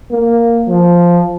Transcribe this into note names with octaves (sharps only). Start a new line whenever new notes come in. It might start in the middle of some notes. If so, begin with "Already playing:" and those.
A#3
F3